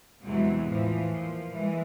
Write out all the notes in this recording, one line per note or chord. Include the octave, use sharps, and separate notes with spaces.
E2 C3 E3 F#3 G#3
A2 E3 F3
A#2 F3
E3 G#3